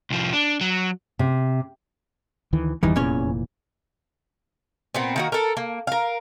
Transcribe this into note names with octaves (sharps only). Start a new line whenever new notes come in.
C2 F3
D4
F#3
C3
D2 D#3 E3
F#1 E2 D#3 E3 G3 D#4
F1 E2 A#2 E3 C#4 C#5
A#2 B3 C4
D#3 A#3 F#4
A4 A#4
A#3
A#4 F5